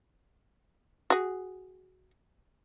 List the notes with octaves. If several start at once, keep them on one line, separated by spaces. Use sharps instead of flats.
F#4 G#4